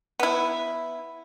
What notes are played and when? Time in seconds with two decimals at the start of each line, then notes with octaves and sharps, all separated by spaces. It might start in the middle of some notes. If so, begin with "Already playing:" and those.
0.20 B3 E4